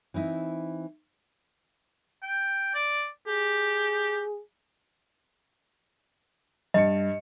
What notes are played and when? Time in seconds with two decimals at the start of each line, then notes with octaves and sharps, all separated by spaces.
0.14 E3 C4 D#4 E4
2.22 G5
2.74 D5
3.27 G4 G#4
6.74 G2 D#5 C#7